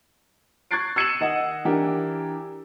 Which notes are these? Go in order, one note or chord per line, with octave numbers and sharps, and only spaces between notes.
C#6 F#6 G#6 A6 C7 D7
E6 G#6 C#7 D#7 E7 F#7
D#3 D#5 F#5
E3 D4 G4 A#4